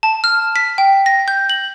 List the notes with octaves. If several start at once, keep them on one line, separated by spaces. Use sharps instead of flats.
A5
F6
B6
G5
A#6
G6
F#7